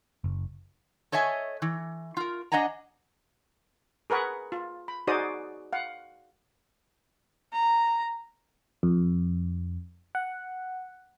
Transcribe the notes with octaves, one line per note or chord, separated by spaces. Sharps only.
F#1
A4 C#5 D#5 E5 G#5
E3
F4 A#4
D4 D#5 F#5 G#5 A#5
G#4 A#4 B4 F#5 C#6
F4
B5
D#4 F#4 G#4 C5 D5 D#6
F5 F#5
A#5
F2
F#5